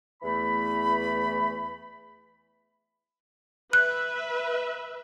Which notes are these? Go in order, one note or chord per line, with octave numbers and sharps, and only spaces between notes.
E2 E3 A3 B5
B4 E5 F#6